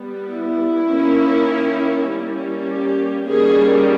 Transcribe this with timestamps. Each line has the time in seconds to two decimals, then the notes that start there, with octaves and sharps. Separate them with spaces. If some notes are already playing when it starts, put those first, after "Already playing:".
Already playing: G3 B3
0.29 E4
0.89 D#3 A#3 C#4
2.06 G3 A#3 C#4
2.66 G4
3.26 D#3 G3 A#3 C#4 G#4